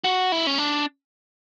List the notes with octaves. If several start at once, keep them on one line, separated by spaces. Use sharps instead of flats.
F#4
E4
C#4
D4